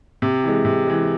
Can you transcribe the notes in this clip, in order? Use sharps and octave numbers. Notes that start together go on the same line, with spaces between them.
C3
E3 G#3
C3
E3 G#3